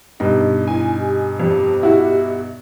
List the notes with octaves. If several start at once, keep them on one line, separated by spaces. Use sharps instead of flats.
G2 B2 D#4 G4
E4 G#5
G4
F2 G4
E4 F#4